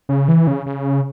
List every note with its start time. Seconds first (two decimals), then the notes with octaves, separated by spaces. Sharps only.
0.09 C#3
0.28 E3
0.47 C#3
0.66 C#3